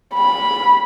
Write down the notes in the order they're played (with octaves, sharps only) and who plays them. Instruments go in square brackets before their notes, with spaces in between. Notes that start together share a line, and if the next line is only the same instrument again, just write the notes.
[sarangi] B5